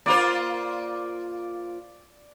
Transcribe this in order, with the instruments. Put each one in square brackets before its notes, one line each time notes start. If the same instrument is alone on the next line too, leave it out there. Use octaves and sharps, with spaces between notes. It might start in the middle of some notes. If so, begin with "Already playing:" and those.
[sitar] A#3 F4 C5 [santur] D5